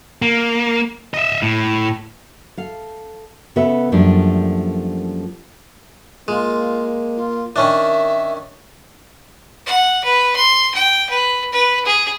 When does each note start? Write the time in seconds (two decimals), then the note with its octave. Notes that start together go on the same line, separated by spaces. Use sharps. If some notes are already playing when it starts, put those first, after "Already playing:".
0.22 A#3
1.14 D#5 E5
1.43 A2
2.57 A4 F5
3.56 C#3 B3 A4 B4 E5
3.92 F#2 F3 G3 A3 A#3 D4
6.28 G#3 A#3 F4
7.16 F4
7.56 D#3 C#4 D4 A#4 E5
9.66 F#5
10.04 B4
10.36 C6
10.74 G5
11.09 B4
11.52 B4
11.85 G#4